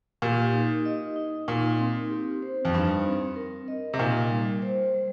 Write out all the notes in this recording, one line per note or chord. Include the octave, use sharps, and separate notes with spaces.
A#2 G4
D#4
D#5
D#4
A#2 D#4
C4
G4
C5
F2
G2 D#4
C4
A#4
D#5
C3
A#2 D#4
G3
C5
G3